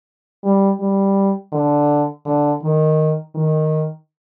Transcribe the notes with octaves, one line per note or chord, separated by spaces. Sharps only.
G3
G3
D3
D3
D#3
D#3